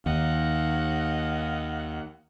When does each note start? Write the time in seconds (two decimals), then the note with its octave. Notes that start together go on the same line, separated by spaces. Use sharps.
0.06 D#2 D#5 F5 F#5